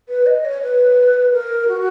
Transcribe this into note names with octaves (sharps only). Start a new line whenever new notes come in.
B4
D#5
C#5
B4
A#4
F#4